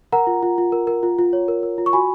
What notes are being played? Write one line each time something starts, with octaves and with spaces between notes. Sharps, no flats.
A#4 F#5 A#5
F4
F4
F4
A#4
A#4
F4
F4
C#5
A#4
A#4
F4
C#6
F#4 G#5 B5